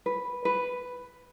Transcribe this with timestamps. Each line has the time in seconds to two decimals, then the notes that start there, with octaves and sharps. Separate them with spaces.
0.06 B4
0.45 B4